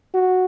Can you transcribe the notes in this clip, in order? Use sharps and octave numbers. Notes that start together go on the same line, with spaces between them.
F#4